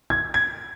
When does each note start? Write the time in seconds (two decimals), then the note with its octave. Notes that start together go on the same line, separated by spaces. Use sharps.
0.10 G#6
0.34 G#6